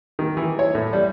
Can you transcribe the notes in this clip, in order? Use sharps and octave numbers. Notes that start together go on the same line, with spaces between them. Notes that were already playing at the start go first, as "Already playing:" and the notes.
D#3
E3
C#5
A2
G3